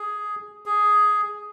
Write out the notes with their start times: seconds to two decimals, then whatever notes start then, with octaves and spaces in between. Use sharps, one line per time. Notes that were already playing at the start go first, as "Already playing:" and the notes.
Already playing: G#4
0.66 G#4